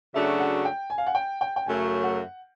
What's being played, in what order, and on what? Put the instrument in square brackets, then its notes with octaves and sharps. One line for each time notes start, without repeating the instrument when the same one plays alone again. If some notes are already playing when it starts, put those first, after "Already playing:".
[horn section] C#3 F#3 A3 D4 F#4 [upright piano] E5
[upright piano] F#5
G5
G#5
F5
F#5
G5
G5
G5
[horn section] F#2 C#3 F#3 A3 [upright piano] G#5
[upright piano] F#5